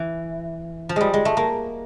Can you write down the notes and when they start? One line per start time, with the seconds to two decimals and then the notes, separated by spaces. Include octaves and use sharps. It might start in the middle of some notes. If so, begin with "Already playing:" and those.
Already playing: E3
0.89 F3
0.96 G3 G#3
1.14 G#3
1.25 A3
1.37 A#3